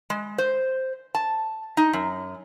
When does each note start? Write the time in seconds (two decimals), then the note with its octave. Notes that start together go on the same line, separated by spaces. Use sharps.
0.10 G#3
0.38 C5
1.15 A5
1.77 D#4
1.93 F#2